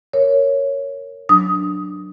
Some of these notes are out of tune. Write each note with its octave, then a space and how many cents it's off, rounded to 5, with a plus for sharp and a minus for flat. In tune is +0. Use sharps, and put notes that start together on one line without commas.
A#4 -10 C#5 +0
F#3 +0 D4 +15 D#6 +10